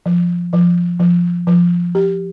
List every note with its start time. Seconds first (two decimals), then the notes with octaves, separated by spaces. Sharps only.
0.06 F3
0.53 F3
1.00 F3
1.47 F3
1.95 G4